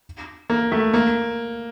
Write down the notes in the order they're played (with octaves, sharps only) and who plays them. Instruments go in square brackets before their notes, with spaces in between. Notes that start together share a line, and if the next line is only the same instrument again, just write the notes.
[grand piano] A#3
A3
A#3